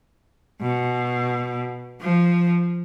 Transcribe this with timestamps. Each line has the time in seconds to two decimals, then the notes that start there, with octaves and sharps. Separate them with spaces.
0.62 B2
2.01 F3